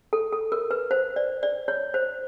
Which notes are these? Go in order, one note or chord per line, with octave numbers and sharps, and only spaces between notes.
A4
A4
A#4
B4
C5
D5
D5
C#5
C5